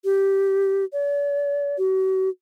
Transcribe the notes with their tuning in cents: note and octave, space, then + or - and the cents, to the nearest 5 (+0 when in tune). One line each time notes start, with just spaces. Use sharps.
G4 -10
D5 -45
F#4 +40